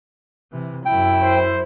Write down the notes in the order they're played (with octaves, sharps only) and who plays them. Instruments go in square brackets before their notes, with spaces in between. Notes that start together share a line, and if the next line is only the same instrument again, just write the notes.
[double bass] C3 E3
[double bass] F#2 E4 [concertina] G5
[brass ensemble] C5